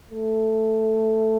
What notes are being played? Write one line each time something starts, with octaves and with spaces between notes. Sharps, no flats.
A3